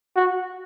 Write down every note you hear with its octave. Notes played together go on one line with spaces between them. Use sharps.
F#4